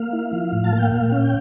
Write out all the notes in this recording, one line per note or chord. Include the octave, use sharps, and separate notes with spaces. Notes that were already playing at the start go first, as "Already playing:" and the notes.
Already playing: A#3 F5
E4
F3
A2
A5
A#3
G5
A#2 F5
C#4
G5